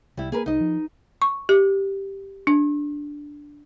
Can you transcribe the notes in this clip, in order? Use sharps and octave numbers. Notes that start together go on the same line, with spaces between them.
C2 G3 E4
A#3 G#4 A#4 B4
C2 D#4 D#5
F3
C#6
G4
D4